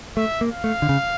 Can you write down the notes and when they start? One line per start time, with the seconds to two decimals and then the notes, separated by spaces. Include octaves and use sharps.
0.17 A3 E5
0.41 A#3
0.52 F5
0.64 A3
0.82 D3
0.89 C#3